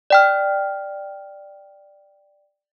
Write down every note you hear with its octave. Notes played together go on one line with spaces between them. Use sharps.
D5 G5 F6